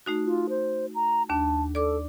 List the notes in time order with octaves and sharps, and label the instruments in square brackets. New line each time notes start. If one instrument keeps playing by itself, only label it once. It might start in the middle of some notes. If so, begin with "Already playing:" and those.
[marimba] A3 D#4 F#4
[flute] F4
C5
A#5
[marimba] D#2 D4 [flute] A5
[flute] A4 [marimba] D5 D6